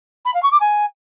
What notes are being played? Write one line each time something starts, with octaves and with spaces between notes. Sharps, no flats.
B5
F5
C#6
D6
G#5